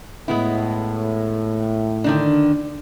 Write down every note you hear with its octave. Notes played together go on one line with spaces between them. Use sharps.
A2 G#3 B3 E4
D3 D#3 D4